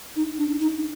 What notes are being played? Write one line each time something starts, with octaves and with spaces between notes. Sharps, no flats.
D#4
D4
D#4